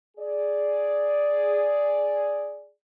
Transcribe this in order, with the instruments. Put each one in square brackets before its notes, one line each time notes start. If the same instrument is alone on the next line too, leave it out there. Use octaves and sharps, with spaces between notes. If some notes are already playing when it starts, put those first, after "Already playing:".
[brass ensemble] G#4 D5